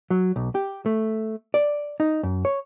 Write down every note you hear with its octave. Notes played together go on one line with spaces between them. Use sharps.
F#3
B1
G4
A3
D5
D#4
F#2
C#5